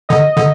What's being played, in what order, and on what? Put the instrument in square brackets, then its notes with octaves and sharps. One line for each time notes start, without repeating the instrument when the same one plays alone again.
[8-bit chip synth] D3 [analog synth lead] D#5
[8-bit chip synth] D3